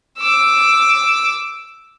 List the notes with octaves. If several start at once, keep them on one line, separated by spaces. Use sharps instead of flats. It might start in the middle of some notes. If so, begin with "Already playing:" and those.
D6 E6